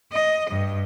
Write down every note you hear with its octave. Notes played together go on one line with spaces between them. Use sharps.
D#5
G2